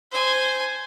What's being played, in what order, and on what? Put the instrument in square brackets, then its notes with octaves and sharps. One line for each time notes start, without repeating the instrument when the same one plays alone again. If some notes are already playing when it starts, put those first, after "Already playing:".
[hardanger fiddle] C5 G#5